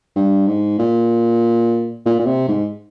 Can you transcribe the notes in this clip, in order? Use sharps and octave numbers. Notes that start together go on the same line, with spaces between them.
G2
G#2
A#2
A#2
A#2
C3
G#2